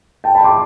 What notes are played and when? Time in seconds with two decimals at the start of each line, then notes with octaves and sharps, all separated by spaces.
0.24 G5 A5
0.35 A5 B5
0.44 C6 D6